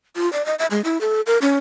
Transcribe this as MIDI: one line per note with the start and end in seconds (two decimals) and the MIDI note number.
0.16 0.31 65
0.33 0.45 74
0.46 0.55 75
0.59 0.66 76
0.71 0.81 56
0.84 1.00 64
1.01 1.21 69
1.27 1.38 70
1.42 1.58 61